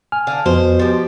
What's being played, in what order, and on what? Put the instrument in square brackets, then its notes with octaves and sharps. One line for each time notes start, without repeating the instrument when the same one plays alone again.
[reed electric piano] G#5 F6
[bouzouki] D3 F5
[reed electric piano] F2 [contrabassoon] B2 [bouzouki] C5
[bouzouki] F3 G4